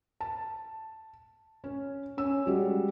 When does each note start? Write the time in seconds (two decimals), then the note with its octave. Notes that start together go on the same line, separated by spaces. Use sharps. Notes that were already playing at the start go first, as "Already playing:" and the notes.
0.21 A5
1.64 C#4
2.18 C#4 E6
2.47 G3 G#3 F#4